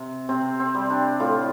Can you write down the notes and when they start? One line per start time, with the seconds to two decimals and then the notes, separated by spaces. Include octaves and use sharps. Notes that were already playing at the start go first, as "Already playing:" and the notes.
Already playing: C3
0.29 C3 C4
0.60 C4
0.75 G3
0.90 D4
1.20 A2 F4